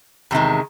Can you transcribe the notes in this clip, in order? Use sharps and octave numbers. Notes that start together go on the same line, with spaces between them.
E2 C3 D#3 G#3